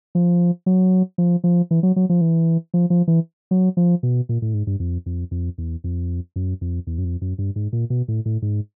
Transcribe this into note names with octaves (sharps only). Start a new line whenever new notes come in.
F3
F#3
F3
F3
E3
F#3
F#3
F3
E3
F3
F3
E3
F#3
F3
B2
A#2
A2
G#2
G2
F2
F2
F2
E2
F2
F#2
F2
E2
F#2
F2
F#2
G2
G#2
A#2
B2
A2
A2
G#2